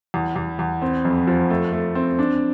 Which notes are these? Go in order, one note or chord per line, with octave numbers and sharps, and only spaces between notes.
E2
E2
E2
C4
F2
F3
A3
A3
C4
D4